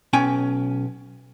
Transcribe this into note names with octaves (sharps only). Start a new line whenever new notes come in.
B1 C#4 G5 G#5